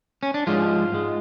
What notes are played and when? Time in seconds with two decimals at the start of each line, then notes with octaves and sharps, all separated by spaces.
0.23 C#4
0.34 D4
0.47 G#2 F3 G#3 F4
0.92 G#2 G#3